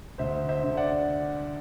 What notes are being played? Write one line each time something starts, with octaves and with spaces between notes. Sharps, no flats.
D2 C5 E5
C5 E5
D3
D5 F#5